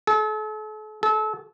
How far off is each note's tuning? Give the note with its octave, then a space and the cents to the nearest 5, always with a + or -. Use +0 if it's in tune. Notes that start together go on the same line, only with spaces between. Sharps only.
A4 -40
A4 -30